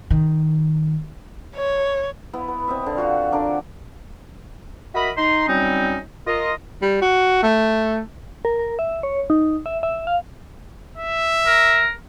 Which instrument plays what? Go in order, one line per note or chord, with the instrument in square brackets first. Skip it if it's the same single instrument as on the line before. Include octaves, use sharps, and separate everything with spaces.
[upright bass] D#3
[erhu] C#5
[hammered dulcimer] B3 E4
B4
C4 D#5 E5
D3 G5
F4 F#4 F5 F#5
D3 D4 A#4 D5
[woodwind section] F#4 A#4 D#5 E5 B5
D#4 C6
F#3 G3 C4 C#4 D#4
F4 A#4 D#5
[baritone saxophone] G3
F#4
A3
[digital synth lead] A#4
A#4
E5
C#5
D#4
E5
E5
F5
[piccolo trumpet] E5
[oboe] A#4